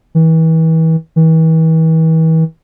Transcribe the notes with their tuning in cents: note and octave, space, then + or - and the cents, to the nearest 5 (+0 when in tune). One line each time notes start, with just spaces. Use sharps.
E3 -35
E3 -40